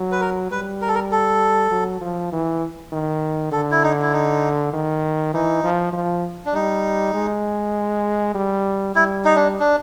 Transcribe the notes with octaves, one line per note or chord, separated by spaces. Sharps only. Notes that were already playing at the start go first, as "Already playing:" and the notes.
Already playing: F#3
B4
A#4
G3 B4
A#4
A4
A#4
A4
F#3
F3
E3
D#3
D3 A4
E4
D#4
E4
D#4
D#3
E3 D#4
F3
F3
D4
G3 D#4
G#3
G3
G3 E4
D#4
D4
D4